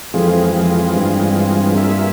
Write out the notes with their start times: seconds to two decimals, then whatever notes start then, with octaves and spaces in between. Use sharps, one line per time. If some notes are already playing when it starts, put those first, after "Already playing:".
0.14 F2 E3 G#3 C4 F4 G#4
0.53 F2
0.93 G2
1.73 A#3 F4 G#4 E5